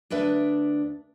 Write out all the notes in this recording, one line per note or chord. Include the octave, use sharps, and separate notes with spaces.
D2 D4 B4 E5